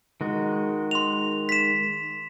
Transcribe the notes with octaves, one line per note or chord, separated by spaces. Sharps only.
D#3 G#3 F#4
C6 F7
B6 E7